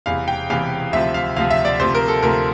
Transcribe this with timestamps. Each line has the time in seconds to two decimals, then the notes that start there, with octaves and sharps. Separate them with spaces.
0.06 E1 E2 C3 E3 F5
0.28 G5
0.50 E1 E2 C3 E3 F5
0.93 D2 C3 F3 E5
1.14 F5
1.36 D2 C3 F3 F5
1.51 E5
1.65 D5
1.80 D2 C3 F3 C5
1.95 A#4
2.08 A4
2.22 D2 C3 F3 A#4